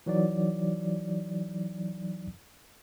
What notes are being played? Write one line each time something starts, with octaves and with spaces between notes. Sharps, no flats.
E3 F#3 D#4 D5